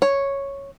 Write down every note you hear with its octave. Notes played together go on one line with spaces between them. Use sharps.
C#5